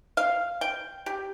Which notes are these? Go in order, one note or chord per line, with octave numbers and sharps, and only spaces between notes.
F5
G5
G4